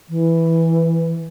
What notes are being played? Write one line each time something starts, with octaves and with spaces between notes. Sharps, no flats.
E3